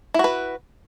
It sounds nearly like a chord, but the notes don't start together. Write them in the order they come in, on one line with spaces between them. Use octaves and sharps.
E4 F#4 B4